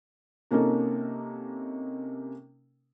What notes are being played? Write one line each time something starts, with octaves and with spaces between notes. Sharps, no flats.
C3 A#3 C#4 D#4 A4 A#4